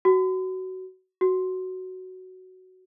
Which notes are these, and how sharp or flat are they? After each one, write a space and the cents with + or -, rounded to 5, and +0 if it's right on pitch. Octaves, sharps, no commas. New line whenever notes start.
F#4 +15
F#4 +5